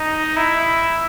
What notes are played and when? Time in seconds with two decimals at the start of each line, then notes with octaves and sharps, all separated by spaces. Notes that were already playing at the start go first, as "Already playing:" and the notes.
Already playing: D#4
0.37 E4